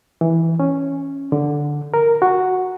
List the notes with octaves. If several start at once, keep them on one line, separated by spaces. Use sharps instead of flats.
E3
C#4
D3
A#4
F#4